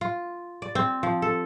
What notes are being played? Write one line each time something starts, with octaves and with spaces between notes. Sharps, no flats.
F4
D5
C4
F3
A4